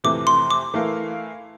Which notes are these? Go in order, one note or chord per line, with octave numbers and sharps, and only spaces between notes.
F2 C3 E3 A3 D6
C6
D6
E3 A3 E4 A#4 F5